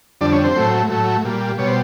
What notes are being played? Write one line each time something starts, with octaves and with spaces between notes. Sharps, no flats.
F2 D3 G3 D4 D5
C#4 C#5
C4 C5
A2 F#3 A3
A2 F#3 A3
A#2 G3
B2 G3 C#5
C5